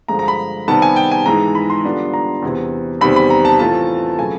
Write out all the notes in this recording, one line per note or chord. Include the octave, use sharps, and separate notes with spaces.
G2 D3 F3 G#3 A#5
A#5
B5
C3 D#3 G3 B3 A5
G#5
G5
G#5
G#2 E3 G#3 A#5
B5
C6
D3 G3 B3 D4 F4
A#5
E2 C3 E3
E2 C3 D#3 G3 C4 B5
B5
A#5
A5
A2 E3 A3 C4 F4 A5
C#3 F#3 A3 G#5